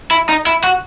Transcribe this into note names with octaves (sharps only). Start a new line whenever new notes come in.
E4
D#4
E4
F#4